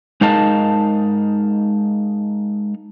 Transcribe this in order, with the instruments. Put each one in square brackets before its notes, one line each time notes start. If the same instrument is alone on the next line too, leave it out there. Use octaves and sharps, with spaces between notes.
[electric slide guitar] G#3 D#4 A#4 D#5 F5 A5